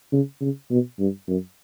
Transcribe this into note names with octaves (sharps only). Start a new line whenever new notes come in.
C#3
C#3
B2
G2
F#2